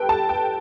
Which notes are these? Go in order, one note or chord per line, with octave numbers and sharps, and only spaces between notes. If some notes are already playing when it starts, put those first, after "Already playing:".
Already playing: G4 A4 B4 G5
A5
G5